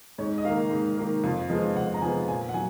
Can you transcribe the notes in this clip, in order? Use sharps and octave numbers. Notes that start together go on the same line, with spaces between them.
G#2 C#5
D#5
D#3 A#3 F5
G#2
D#3 A#3
F2
F3 G#3 B3
F2 F#5
A#5
F3 G#3 B3 G#5
A#2 G#5
F#5
F#3 G#5